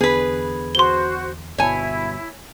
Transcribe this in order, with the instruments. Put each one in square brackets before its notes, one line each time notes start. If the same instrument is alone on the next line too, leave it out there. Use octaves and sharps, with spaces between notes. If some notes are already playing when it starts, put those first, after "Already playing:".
[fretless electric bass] E2 D3 B3 [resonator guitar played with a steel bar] G#4 B4
[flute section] F#4 C5 [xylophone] C6 G7
[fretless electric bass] G1 B2 [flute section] E4 [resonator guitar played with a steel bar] C#5 G#5